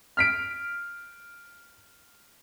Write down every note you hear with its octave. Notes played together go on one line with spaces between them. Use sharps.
F6 B6 D7